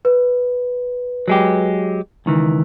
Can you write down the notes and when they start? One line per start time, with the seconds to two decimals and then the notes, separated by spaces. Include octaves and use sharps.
0.05 B4
1.28 F#3 G#3 G4
2.26 C#2 D#3 E3